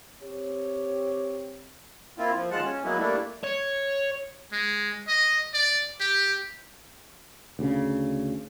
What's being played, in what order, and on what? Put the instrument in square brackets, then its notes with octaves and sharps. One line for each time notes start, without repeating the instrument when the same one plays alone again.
[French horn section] C4 G4 C#5
[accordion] A#3 C4 E4 F4
F3
D#2 G#3 F4 F#5 A5
C#4
F#3 G#3 A#3 B3 E4
G3 A3 A#3 D4 E4
[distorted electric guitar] C#5
[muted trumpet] G#3
D#5
D5
G4
[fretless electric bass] D2 C#3